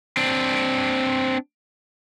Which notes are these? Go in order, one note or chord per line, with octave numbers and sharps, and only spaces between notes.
C4 D4